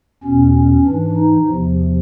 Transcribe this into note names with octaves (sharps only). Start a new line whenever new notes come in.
E2 B2 C#4
C#4
G#2 E3 D4
D#4
E2 C3 F3